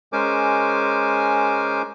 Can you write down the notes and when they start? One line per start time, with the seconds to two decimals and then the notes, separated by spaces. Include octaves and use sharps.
0.13 G#3 C#4 A#4 C5 G#5 D6